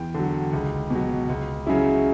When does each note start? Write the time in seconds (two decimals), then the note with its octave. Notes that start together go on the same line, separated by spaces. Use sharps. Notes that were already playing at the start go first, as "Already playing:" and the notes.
Already playing: E2 G5
0.14 D3 F#3
0.53 C#2
0.90 B2 F#3
1.29 C#2
1.67 C#3 F#3 C#4 E4